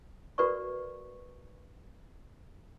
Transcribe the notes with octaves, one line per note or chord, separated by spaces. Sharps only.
F#4 A#4 B4 D5 E5 C#6